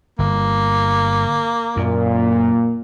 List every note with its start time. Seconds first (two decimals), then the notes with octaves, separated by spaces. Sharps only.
0.19 G1 A#3
1.77 F#2 A#2